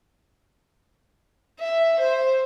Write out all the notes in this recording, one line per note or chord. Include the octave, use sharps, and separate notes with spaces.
E5
C5